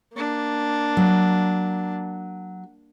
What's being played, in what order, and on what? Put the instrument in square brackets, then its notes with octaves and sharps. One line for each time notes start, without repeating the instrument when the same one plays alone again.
[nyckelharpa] A#3 D4
[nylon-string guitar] F#3